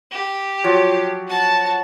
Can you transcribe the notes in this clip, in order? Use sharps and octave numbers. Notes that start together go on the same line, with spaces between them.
G4
F3 F#3
F#4 A5